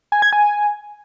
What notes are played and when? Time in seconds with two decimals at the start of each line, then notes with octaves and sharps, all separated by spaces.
0.12 G#5
0.22 G#6
0.33 G#5